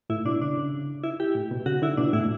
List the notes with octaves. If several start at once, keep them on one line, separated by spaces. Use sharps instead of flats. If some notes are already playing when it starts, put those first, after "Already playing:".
A2 E4
B2 D4
C#3 D4
C#3
E4
G4
A2
B2
C#3 F#4
D3 E4
B2 D4
A2 E4